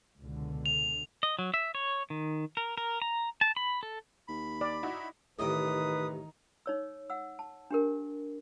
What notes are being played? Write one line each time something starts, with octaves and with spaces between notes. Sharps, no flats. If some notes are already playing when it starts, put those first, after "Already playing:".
C#2 B2 D3
F7
D#5
F#3
E5
C#5
D#3
A#4
A#4
A#5
A5
B5
A4
D#2 B5
D5
D#4 E4 F#4
A1 C3 D#3 D#4 B4 D6 D#6
D#4 C#5 E6
F#5 E6
A5
D4 G4 A#4